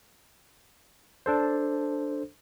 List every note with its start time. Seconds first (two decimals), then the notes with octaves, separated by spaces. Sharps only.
1.26 D4 A4 C5